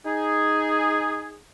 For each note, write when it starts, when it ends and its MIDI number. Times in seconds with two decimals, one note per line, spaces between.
0.06 1.37 63
0.06 1.37 68